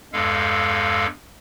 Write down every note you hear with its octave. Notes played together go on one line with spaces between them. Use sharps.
E2 G2 G#3 A4 F5